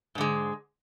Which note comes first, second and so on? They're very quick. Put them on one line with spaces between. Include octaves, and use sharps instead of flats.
G#2 D3 G#3